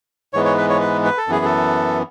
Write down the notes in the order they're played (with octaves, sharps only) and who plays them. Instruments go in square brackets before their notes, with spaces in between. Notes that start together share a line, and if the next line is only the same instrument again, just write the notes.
[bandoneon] G#2 E3 G#3 B3 C#5
C#5
B4
C#5
B4
B4
A4
F#2 E3 B3 G#4
A4